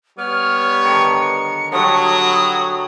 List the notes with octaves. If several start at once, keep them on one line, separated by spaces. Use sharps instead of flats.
G3 B3 C#5 F6
D3 D#3 C#7
D3 F#3 G3 F#4 C#5 D#6